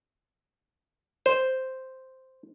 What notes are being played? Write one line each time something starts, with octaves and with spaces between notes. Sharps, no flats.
C5